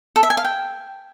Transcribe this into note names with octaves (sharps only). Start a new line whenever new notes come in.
A4
E5
G#5
F5
G5